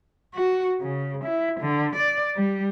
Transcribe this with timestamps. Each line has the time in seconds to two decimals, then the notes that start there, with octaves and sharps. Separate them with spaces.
0.35 F#4
0.81 C#3
1.24 E4
1.60 D3
1.96 D5
2.36 G3